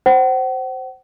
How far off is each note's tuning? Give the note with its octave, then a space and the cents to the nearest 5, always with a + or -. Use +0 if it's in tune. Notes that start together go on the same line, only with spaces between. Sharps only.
C5 +0 F#5 +40